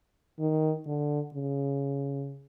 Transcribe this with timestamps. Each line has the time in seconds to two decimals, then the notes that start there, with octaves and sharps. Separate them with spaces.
0.39 D#3
0.86 D3
1.34 C#3